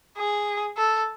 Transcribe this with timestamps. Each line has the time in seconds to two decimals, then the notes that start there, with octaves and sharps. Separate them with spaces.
0.17 G#4
0.77 A4